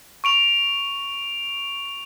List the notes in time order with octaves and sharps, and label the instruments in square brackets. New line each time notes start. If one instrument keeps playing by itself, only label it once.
[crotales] C#6 D7 F7